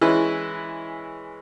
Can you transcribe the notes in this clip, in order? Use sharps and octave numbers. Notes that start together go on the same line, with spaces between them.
E3 G#3 C#4 E4 B4